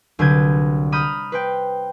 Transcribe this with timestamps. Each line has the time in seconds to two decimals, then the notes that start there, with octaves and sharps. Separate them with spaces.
0.19 C2 D3 F#3 B4 G6 G#6
0.92 A#5 B5 D#6 F6 G6 A#6
1.32 B4 C5 G5